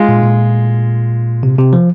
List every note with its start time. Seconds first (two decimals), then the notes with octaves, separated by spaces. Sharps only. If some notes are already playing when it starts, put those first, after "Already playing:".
Already playing: G#3 F4
0.09 A#2
0.23 A#2
1.43 C3
1.58 C3
1.73 F3